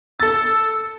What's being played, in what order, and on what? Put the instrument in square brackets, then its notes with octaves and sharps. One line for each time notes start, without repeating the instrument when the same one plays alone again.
[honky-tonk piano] A4 A6 [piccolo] E6